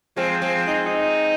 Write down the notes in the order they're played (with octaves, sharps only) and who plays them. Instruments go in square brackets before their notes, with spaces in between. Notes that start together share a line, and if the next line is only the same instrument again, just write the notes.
[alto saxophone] F3 [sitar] G#3 C4
[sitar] G#3 C4
[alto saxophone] D#4
D#4